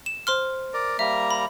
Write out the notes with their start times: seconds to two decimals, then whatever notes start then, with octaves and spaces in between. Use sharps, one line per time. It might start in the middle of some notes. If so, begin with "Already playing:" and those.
0.06 E7
0.27 C5 C6 F6
0.74 A#4 D5
0.99 G3 A#3 E5 A#5
1.31 B5